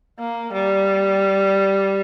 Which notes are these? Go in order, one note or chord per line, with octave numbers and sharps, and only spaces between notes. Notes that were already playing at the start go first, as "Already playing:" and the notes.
A#3
G3